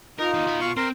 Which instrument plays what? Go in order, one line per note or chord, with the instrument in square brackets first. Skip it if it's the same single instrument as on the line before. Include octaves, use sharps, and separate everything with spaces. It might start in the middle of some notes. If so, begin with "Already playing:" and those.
[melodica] D#4 [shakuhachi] F4 [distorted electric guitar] A#4
[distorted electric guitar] D#3 A#3
B2 B5
[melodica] F5 C#6
[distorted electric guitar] C4 [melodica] A#4 C6